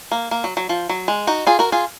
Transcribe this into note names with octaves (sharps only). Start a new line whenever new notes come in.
A#3
A#3
F#3
F#3
F3
F#3
G#3
D#4 F#4
F4 G#4
F#4 A#4
F4 G#4